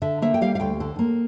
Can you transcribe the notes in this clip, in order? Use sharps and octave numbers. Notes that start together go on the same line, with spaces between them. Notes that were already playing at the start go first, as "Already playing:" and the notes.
D3 E5
A#3 E5
G5
G3 F5
F5
D2 G5
D3
A#3